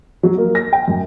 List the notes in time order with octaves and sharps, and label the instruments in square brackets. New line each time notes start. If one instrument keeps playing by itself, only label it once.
[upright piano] F#3
A#3
A#6
G5
F#2